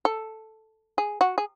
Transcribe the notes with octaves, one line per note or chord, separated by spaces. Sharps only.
A4
G#4
F#4
G#4